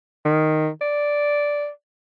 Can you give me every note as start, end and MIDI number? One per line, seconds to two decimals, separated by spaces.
0.25 0.69 51
0.81 1.69 74